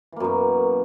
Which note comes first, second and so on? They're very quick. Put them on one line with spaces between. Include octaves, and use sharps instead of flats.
E3 A#3 F#2 B2